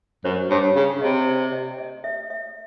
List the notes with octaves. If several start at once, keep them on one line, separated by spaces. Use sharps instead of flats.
F#2 C5
G2 C#5
C#3 F5
C3 D#5
D5
D#5
D#5
E5
E5